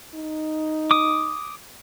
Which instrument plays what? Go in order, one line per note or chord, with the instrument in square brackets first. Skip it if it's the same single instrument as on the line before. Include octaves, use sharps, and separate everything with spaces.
[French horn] D#4
[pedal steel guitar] D6 D#6